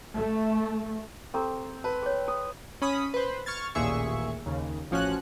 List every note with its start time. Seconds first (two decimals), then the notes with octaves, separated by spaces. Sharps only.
0.16 A3
1.34 C4 G4 A4 A#5
1.84 B4 A5
2.03 G#4 C#5
2.28 D#6
2.82 C#4 B5 D#6
3.14 B4 C5
3.46 C#6 F6 G#6 A6
3.75 A1 D#2 A#2 G#4 E5 C#6
4.46 D#2 C#3
4.91 A1 F3 C#4 F#4 F#6